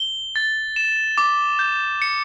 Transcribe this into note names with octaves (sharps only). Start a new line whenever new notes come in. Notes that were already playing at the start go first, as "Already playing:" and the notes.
Already playing: G7
A6
E7
D6
G6
C#7